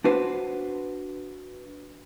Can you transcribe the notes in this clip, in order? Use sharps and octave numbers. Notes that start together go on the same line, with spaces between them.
D4 F#4 B4 C5